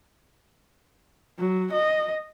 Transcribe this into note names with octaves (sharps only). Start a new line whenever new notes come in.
F#3
D#5